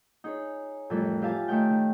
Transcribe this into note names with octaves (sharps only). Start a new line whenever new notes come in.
D#4 G#4 C#5
F2 A2 E3 G3 A4 A#4
F4 G4 E5 F5 G#5 A5
D#3 A3 D#4 C#5 G5 G6
D#3